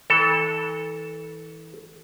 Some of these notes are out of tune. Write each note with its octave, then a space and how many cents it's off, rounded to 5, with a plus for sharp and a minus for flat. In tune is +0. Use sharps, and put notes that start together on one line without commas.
E3 -30 A4 +0